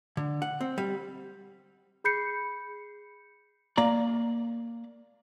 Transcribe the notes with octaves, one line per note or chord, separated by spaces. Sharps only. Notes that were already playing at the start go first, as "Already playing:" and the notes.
D3
F#5
C4
G3
G#4 B5 G6 C7 C#7
A#3 D5 A#5